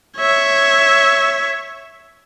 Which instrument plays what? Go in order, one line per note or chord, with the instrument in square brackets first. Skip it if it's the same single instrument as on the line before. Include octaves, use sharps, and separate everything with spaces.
[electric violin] C#5 E5